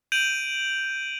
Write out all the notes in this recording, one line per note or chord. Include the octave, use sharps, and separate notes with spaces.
G6 D7 D#7 F7 F#7